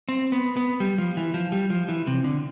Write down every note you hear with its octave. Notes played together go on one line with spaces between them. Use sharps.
C4
B3
B3
G3
F3
E3
F3
G3
F3
E3
C3
D3